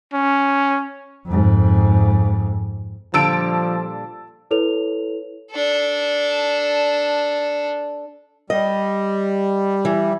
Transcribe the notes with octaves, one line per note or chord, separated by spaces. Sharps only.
C#4
F2 G#2
A#2 D3 F3 G3 A5 E6 D7
E4 A4 B4 C#5 F7
D4 A4
G3 D#5
E3